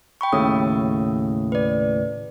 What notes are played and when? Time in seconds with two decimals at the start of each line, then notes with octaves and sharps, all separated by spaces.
0.21 G5 B5 C#6
0.33 D#2 A2 C#3 D#6 E6
1.52 B4 D5